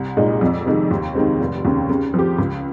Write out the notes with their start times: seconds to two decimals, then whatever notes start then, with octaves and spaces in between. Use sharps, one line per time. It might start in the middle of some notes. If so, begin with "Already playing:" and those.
Already playing: C2
0.17 A#2 G#3 D#4
0.41 F2
0.66 C3 D#3 G#3
0.91 D#2
1.15 D#3 G#3 C4
1.40 F1
1.65 D#2 C#3
1.89 C#3
2.14 F3 C4 G4
2.39 C#2